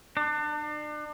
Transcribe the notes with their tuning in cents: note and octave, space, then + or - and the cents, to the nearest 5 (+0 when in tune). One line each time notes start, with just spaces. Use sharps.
D4 +35